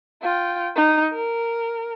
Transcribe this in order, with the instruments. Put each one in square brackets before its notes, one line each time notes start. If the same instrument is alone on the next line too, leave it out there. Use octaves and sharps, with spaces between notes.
[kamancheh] F4 G5
D#4
A#4